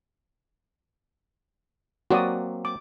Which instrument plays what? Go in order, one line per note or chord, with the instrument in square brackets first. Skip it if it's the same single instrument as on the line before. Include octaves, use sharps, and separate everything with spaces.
[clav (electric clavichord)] F#3 A#3 C4 [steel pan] F#4 D5 D#6
[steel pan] D6